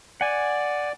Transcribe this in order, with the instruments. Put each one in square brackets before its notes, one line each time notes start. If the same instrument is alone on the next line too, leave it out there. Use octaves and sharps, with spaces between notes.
[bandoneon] D5 [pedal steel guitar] F#5 G#5